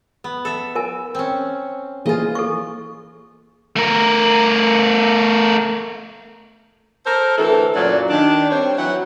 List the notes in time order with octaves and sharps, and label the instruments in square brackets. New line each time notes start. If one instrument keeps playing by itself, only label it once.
[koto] B3
A4 E5
[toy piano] A#4 G#5
[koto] C4 C#4
[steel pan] E3 A#3 G#4 [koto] F4 D#5
[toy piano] A4 C#6
[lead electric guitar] A3 A#4
[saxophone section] A4 A#4 C5
D2 E3 A4
F#2 A#2 F#3 D5
D#3 D4
G3 C4 C5 C#5
E3 F#3 F#5